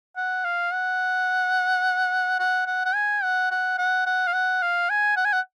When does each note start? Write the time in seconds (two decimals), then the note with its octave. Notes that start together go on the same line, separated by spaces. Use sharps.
0.17 F#5
0.44 F5
0.73 F#5
2.39 F#5
2.67 F#5
2.85 F#5
2.95 G#5
3.23 F#5
3.51 F#5
3.78 F#5
4.06 F#5
4.27 F5
4.33 F#5
4.62 F5
4.90 G#5
5.17 F#5
5.25 G#5
5.33 F#5